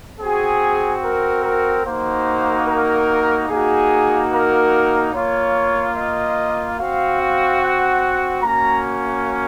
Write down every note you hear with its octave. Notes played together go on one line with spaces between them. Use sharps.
C4 F#4 G#4
A#4
A#4
A#3 D#4 F#4 C5
A#4
A#3 D#4 F#4 G#4
A#4
A#3 F4 C#5
D#5
C4 F#4 F5
F5
F#5
A#3 C#4 F#4 A#5